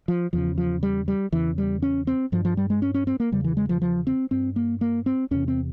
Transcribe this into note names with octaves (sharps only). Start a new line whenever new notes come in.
F3
E2 C#3 F3
F3
G3
G3
E2 C#3 E3
G3
C#4
C4
G2 F3
F3
G3
G#3
C#4
C#4
C4
A#3
E2 C#3 G3
E3
G#3
F3
F3
C4
G2 C4
A#3
A#3
C4
E2 C3 C#4
C4